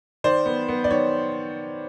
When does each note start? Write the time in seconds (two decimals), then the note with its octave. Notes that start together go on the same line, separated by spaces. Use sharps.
0.24 D#3 C5 D5
0.46 B3
0.69 B3
0.84 D5
0.91 D#3 C#5